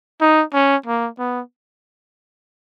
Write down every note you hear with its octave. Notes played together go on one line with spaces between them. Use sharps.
D#4
C#4
A#3
B3